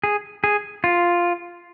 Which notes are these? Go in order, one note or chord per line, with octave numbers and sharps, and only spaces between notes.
G#4
G#4
F4